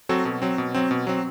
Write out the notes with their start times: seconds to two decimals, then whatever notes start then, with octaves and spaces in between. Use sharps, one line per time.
0.09 F#3 C4 F#4 A4
0.25 B2
0.42 F#3 C4
0.58 B2
0.74 F#3 C4
0.91 B2
1.07 F#3 C4